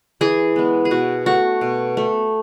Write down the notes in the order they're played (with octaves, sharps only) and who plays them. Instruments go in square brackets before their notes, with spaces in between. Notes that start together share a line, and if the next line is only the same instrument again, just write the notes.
[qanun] E3 G#4
G#3 B3
G#4
B2 F#4
A3 F#4
B2
A3